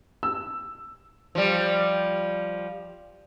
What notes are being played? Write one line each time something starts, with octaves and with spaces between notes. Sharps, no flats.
E6
F3 G3